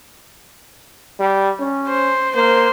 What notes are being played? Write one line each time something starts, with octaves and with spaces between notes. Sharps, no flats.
G3
C#4
C5
A#3 C5